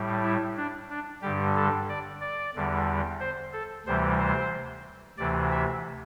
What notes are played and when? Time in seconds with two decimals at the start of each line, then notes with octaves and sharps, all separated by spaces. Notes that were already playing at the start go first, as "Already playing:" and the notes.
Already playing: A2 G3
0.23 E4
0.57 D4
0.89 D4
1.22 G2 D3 G3 G4
1.56 A4
1.89 D5
2.21 D5
2.55 E2 D3 G3
3.20 C5
3.53 A4
3.86 D2 C3 E3 G3 C5
4.19 C5
5.18 D2 C3 E3 D5
5.51 E5